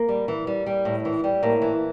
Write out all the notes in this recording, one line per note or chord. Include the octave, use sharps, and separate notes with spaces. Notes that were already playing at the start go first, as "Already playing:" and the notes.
Already playing: A#3
G3
E3
G3
G3
A2
E3
G3
A2 A#3
E3